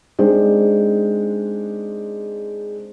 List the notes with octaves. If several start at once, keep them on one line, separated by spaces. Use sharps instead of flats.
G#3 C4 D4 D#4 C5